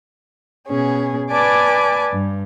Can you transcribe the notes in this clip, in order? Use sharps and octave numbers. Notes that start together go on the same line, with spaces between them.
B2 C#4 G#4
B4 D5 G#5 A5 D6
G2